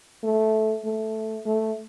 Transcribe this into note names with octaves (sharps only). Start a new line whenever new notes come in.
A3
A3
A3